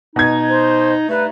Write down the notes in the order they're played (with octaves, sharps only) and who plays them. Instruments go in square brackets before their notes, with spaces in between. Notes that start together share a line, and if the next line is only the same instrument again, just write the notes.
[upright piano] B2 G#6 [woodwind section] D#4
[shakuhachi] C5
[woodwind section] G2 A3 D#4 [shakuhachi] B4